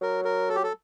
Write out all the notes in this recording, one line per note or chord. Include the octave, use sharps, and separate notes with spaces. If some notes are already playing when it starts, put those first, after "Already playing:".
F#3 A#4
A#4
A4
G4
A4